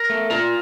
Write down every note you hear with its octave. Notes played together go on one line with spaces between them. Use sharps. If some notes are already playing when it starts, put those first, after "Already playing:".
Already playing: A#4
A3
F4 A#4